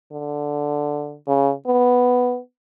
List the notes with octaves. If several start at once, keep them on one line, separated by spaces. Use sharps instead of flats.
D3
C#3
B3